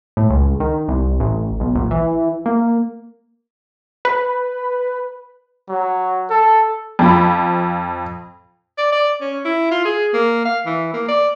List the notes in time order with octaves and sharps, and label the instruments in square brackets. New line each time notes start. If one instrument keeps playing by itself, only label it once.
[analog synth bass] A2
C#2
D#3
C2
A1
B1
A#1
E3
A#3
[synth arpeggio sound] B4
[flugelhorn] F#3
A4
[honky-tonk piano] F2 F3 B5
[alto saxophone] D5
D5
C#4
E4
F4
G#4
A#3
F5
E3
A#3
D5